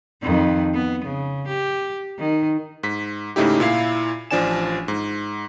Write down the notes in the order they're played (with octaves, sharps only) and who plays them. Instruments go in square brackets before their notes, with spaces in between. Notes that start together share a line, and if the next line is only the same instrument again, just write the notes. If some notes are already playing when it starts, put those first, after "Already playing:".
[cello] F2 D#3
B3
C#3
G4
D#3
[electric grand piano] G#2 B6
G#2 C#3 A3 D#4 E4 G4
A#2 E4 F5 C7
A1 F3 D4 D5 G#5 E7
G#2